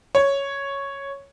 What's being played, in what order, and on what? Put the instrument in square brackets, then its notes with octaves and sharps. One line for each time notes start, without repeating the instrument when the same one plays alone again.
[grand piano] C#5